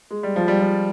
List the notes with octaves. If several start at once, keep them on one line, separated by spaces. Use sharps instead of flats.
G#3
G3
F3
G3
F3